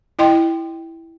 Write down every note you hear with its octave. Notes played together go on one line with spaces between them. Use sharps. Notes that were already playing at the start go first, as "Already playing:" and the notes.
E4 D#5 G5 C6